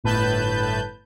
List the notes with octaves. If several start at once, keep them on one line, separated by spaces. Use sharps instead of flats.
G1 A2 B4 A5 G6